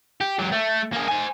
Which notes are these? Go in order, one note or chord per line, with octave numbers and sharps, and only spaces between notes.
G4
F#3 G4
A3
A#3 G#4
C5 G#5